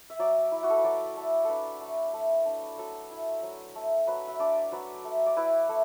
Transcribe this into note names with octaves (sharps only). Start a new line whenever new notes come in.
E5
F#3 D5
E4
F#4
A4
B4
F#3 D5
A3
D4 A4 B4
A3
A3
D4
F#3 A4
E4
F#3
A3
F#3 B4
E5
D4 D5
F#3 B4
A3
D5
E4 B4
A3